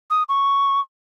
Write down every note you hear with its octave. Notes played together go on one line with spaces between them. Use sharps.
D#6
C#6